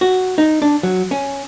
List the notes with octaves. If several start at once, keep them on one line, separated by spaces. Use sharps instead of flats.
F#4
D#4
D4
F#3
C#4